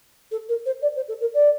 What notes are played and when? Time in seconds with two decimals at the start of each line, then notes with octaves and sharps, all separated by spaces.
0.31 A4
0.49 A#4
0.66 C5
0.82 D5
0.96 C5
1.08 A4
1.21 A#4
1.34 D5